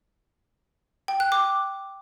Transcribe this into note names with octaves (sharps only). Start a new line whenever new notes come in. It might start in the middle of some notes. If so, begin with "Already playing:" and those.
G5
F#6
D6